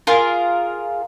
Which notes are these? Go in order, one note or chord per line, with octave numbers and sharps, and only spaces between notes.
F4 G#4 A#4